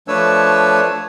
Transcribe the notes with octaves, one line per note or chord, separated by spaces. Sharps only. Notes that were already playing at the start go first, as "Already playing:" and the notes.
F3 A3 D4 B4 C#5 E6